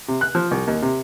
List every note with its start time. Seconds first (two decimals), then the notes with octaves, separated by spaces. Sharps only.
0.08 C3
0.21 F#6
0.35 F3
0.51 C2
0.67 D#2
0.82 C3